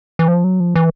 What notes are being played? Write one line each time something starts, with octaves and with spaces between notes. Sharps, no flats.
E3
F3
F#3
F3
E3